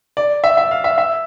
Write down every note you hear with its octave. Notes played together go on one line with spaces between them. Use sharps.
D5
E5
E5
F5
E5
E5